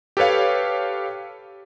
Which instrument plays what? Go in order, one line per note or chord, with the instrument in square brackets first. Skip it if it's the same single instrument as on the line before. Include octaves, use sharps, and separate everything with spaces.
[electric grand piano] G4 A4 B4 C#5 F5